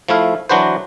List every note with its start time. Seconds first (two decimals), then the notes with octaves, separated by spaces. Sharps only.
0.08 F3 A3 E4 F5
0.49 E3 F#3 D4 F#4 B4 C5